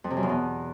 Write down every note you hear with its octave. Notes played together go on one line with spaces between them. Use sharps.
F2
C3
F#2
E2
B2